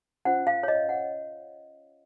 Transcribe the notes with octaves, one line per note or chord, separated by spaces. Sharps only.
C#4 F4 C5 F#5
F5
C#5
D#5
F#5